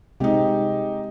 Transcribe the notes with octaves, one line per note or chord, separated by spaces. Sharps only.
C3 G#3 C4 D#4 G4